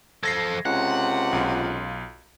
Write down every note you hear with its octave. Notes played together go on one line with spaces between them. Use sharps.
F3 A4 G#6 A#6 C7
C#2 C3 F#5
B1 F4